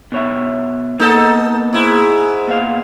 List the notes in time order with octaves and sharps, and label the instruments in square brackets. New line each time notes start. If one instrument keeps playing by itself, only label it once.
[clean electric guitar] B2 C#5 E5
[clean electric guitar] A#3 B3 [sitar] D#4 A4
[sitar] G#2 E4
[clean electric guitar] A#2 B3 F5